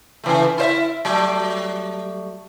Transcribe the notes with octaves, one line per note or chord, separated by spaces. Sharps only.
C#3 E3 A3
E4 C5 E5
F#3 G3 A3